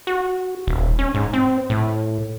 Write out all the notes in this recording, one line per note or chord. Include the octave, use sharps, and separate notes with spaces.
F#4
D#1
C#4
G#2
C4
A2